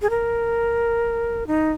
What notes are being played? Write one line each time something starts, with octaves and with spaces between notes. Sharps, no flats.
G#4
A#4
D#4